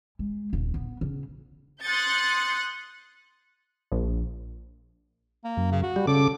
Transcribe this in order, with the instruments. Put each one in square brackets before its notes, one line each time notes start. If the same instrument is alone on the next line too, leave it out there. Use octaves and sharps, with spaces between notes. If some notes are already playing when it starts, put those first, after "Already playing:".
[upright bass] G#3
D#1
B3
C#3
[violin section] C6 D#6 F#6 G6 A6 C#7
[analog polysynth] A#1
[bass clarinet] A#3
[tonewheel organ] F#2
[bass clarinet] C#3
F#4
[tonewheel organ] G3
[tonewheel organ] C#3 D6 [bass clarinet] A4